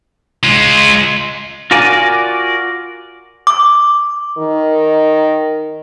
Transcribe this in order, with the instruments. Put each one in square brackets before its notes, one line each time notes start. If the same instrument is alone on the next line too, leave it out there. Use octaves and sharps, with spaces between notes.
[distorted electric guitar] G#3 F4
[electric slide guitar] F4 F#4 A#4 D5 G#5
[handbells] D6
[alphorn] D#3